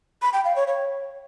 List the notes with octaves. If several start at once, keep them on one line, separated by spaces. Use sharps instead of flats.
B5
G5
F5
C#5
C#5